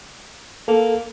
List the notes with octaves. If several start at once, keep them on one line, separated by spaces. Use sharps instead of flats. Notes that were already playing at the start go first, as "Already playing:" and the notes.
A#3 A4